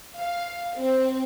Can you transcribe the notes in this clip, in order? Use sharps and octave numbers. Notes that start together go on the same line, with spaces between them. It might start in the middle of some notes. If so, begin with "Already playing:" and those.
F5
C4